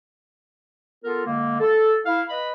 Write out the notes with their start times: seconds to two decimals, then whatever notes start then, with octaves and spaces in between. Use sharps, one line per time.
1.03 B3 F4 A4 A#4
1.26 D3 G#3 A#3
1.60 A4
2.05 E4 F5
2.29 B4 D#5 B5